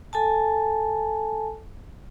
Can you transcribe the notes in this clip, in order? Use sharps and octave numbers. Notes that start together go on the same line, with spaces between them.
A4 G#5 A5